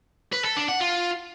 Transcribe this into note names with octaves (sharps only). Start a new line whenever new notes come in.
B4
A4
D4
F#5
F4